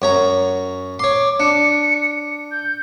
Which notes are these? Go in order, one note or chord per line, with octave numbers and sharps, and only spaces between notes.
F#2 C#5 A#5
C#5 C6 D6
D4 C#7
G6